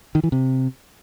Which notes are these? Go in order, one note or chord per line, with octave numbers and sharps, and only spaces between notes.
D#3
E3
C3